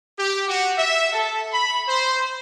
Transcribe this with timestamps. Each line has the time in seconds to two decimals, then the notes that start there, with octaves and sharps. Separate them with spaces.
0.19 G4
0.49 F#4
0.78 E5
1.13 A4
1.53 B5
1.89 C5